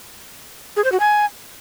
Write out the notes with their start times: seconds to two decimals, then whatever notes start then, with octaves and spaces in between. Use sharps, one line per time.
0.76 G#4
0.84 C5
0.92 F#4
1.00 G#5